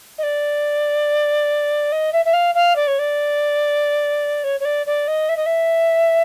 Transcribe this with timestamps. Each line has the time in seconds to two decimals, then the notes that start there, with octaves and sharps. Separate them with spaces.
0.18 D#5
0.23 D5
1.92 D#5
2.13 E5
2.25 E5
2.33 F5
2.54 F5
2.76 D5
2.87 C#5
2.99 D5
4.43 C#5
4.60 C#5
4.65 D5
4.86 D5
5.07 D#5
5.29 E5
5.36 D#5
5.46 E5